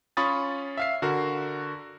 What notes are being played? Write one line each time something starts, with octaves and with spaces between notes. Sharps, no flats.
C#4 F4 B5 C#6 D#6 A6
E5 F5 C7
D3 F#4 A#4